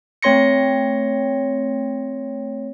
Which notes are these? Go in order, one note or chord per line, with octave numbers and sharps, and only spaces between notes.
A3 C4 C#5 C6 A#6 C#7